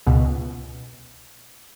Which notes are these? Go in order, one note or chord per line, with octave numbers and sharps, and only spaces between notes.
C#2 B2